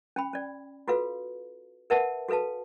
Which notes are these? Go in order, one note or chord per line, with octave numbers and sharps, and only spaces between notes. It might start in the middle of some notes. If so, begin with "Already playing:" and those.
C#4 G5 B5
C#4 D5
F4 F#4 A4 B4 F5
A#4 B4 E5 F#5 A5
F#4 A4 B4 F5 A5